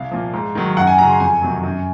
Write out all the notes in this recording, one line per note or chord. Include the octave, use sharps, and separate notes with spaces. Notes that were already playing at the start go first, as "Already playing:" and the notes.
Already playing: C2 F5
A#2 F3
G#2
D#3 F#3
F#2 F#5
G#5
C#3 F#3 A#5
C6
F2 G#5
C3 D#3 F#3
F#2